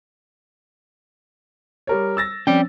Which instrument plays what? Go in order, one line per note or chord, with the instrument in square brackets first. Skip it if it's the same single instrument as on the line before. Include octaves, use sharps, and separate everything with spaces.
[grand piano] G3 A#4 C#5
E6 A6 A#6
[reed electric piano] F3 C4 C#4 [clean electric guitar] D5 G5